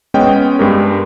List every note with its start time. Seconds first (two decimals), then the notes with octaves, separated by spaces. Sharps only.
0.14 G#3 B3 C#4 D#5 G5
0.59 G2 G#3 G4 A#4